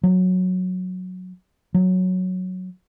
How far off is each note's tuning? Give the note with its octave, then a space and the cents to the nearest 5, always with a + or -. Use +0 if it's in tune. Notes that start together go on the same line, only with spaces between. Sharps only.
F#3 -10
F#3 -5